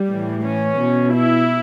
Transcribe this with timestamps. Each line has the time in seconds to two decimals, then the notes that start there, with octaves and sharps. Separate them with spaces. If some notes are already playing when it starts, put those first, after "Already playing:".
Already playing: G3
0.08 A2 E3
0.43 C#4
0.78 B2
1.13 E4